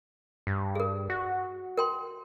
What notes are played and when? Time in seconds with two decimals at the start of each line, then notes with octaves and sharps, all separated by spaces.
0.47 G2
0.75 G#4 A#4
1.10 F#4
1.78 A#4 G5 C6